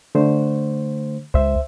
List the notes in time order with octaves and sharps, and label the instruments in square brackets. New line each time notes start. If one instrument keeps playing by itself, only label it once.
[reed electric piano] D3 A3 C5
[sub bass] C#2 [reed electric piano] C5 E5